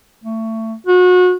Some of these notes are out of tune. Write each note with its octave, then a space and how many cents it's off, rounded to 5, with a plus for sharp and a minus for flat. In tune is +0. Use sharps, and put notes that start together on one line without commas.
A3 +25
F#4 -30